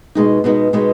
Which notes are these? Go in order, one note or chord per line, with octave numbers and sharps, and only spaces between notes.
B2 G#3 B3 D#4
B2 G#3 B3 D#4
B2 G#3 B3 D#4